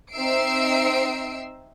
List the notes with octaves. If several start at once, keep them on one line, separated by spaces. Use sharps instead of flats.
C4 D#4 E5 E6 C7 D7